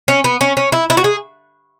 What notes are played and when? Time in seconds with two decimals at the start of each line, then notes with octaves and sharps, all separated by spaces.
0.08 C#4
0.24 B3
0.41 C#4
0.57 C#4
0.72 E4
0.90 E4
0.97 F#4
1.04 G#4